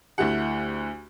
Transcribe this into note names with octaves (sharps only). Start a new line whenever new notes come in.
D2 A3 E4 G4 F#5